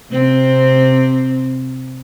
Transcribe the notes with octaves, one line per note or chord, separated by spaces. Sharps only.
C3 C4